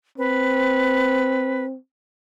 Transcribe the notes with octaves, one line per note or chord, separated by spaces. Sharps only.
C4 B4